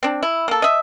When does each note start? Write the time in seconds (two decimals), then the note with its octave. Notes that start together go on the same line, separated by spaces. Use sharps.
0.03 C4 D4
0.23 E4
0.48 A#3 A4
0.62 D#5 E5